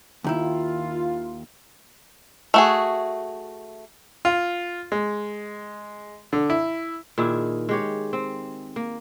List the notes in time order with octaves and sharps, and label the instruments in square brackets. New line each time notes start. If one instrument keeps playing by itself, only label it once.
[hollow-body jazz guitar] D#2 D#3 E4 [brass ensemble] F4
[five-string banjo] A3 F#4 G#4
[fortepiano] F4
G#3
D3
E4
[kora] A#2 D#3 E4 G#4
G#3 G4 C#5
C4
A#3